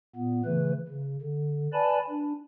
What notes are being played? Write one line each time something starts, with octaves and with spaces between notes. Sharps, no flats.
A#2 B3
C#3 E3 A3 B4
C#3
D3
B4 D5 G#5 A5 B5
D4